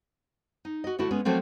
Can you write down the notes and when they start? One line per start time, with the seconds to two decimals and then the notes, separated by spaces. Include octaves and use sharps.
0.65 D#4
0.84 F#4 D#5
0.99 D3 A3 E4 F#4
1.11 G#3 B3 C#4
1.25 F3 F#3 A3 A#3 C4